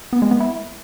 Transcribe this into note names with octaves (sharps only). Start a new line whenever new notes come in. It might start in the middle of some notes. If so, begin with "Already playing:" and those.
B3
G#3
B3
E4